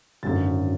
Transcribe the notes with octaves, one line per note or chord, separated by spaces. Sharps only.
G#1 F#2 D3 A6